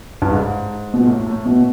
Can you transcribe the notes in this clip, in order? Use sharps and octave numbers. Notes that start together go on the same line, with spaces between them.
G2
G#2
B2
A#2
A2
A2
B2